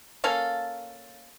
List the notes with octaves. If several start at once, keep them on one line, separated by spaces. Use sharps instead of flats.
A#3 C#4 A4 F5